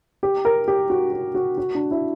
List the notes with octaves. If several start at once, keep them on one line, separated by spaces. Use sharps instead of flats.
G4
A#4
G4
F#4
F#4
F#4
F#4
D4
E4